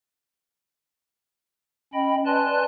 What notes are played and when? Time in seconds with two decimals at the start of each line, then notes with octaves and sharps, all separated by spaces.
1.94 C#4 D#5 G5 B5
2.26 B4 D5 G#5 A5 C6 F#6